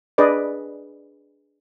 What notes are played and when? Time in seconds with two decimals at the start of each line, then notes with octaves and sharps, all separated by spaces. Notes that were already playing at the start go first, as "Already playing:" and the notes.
0.18 D4 G#4 B4 D5 D#5